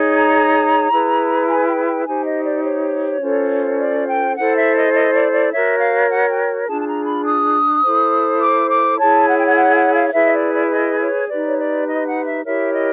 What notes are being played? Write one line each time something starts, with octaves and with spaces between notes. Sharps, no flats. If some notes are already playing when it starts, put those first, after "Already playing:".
Already playing: D#4 G#4 C#5
A#5
E4 G#4 B4
G#5
G5
G5
D#4 G4 C5 G#5
D#5
D5
C#5
C#4 F4 A4 C5
D5
G5
E4 A4 C5 F#5
E5
D#5
D#5
D5
D5
F#4 A#4 C#5 E5
F5
F#5
G5
D4 F4 G#4 A5
A5
A#5
B5
D#6
E4 A4 C5
D6
D6
E4 G#4 C#5 A5
F#5
G5
F#5
F#5
F#5
F5
F5
E4 G#4 B4 E5
D#5
D5
D5
D5
D#5
C#5
D#4 G4 B4 D5
C#5
D5
D#5
F#5
E5
E4 G4 A#4 C#5 E5
D#5